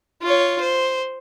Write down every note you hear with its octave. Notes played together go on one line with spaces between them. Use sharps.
F4 C#5
C5